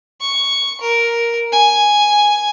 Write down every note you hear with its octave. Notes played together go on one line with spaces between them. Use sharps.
C#6
A#4
G#5